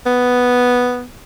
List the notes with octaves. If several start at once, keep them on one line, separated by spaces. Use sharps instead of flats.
B3